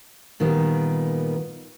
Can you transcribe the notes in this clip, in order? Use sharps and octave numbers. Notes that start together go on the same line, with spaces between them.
A#2 D#3 G3 B3